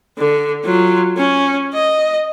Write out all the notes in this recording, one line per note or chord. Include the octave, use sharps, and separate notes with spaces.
D3
F#3 F4
C#4
D#5